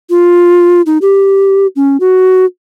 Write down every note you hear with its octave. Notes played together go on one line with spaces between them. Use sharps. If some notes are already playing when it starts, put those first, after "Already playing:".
F4
D#4
G4
C#4
F#4